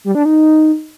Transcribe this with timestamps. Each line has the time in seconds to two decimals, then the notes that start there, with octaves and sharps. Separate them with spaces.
0.04 G3
0.15 D4
0.25 D#4